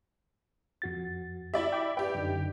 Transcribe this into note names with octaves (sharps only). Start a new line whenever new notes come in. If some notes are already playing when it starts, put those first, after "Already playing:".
F2 F#4 A6
E4 F#4 G4 D5 E5
G5 D6
G4 B4 D5 G5
F#2 D3 D#4